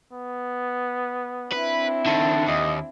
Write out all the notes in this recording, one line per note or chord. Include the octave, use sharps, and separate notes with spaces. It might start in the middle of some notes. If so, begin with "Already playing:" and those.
B3
C4 D4 E4 B4
D3 D#3 A5
D#2 D#5